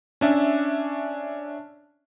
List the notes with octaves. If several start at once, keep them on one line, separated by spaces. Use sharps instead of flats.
C#4 D4 E5